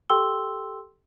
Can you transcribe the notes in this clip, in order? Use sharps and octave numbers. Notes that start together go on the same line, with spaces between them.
G4 A4 G5 C6 E6 G7